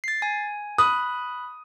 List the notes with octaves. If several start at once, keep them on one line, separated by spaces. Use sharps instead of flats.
A6 C7
G#5
B5 D#6 F#6